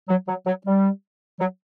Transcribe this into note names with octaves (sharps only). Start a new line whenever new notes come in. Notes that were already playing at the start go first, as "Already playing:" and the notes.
F#3
F#3
F#3
G3
F#3